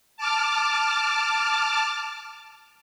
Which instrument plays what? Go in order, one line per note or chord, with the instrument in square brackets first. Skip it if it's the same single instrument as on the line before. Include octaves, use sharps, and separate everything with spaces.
[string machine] A5 D6 F6